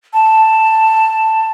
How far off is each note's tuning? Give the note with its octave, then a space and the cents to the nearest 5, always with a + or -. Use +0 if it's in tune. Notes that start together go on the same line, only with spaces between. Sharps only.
A5 +5